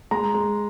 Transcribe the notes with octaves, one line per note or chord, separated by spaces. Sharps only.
G#3 A#5
G#3